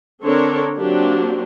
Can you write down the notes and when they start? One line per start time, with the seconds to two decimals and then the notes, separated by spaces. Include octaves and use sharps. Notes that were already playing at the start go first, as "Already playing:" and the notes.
0.24 D3 C4 D4 A4 A#4 C#5
0.78 F#3 A#3 C4 D4 F#4 G4